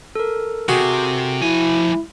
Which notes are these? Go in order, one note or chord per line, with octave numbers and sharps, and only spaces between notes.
A4 A#4
C3 F#4 G#4
F3 E4 G#5